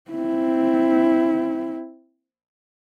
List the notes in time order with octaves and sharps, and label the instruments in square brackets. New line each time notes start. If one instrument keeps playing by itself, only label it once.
[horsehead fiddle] C4 E4